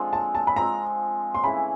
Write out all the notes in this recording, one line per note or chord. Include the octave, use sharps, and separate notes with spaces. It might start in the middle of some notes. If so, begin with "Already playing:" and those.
Already playing: D3 F3 G#3 C4
A5
A5
B5
F3 G#3 C4 A#5
C6
C#3 E3 A3 B5